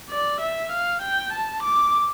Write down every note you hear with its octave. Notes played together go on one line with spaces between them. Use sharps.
D5
E5
F5
G5
A5
D6